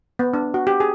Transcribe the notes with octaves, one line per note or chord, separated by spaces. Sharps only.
B3
D4
F#4
G4
G#4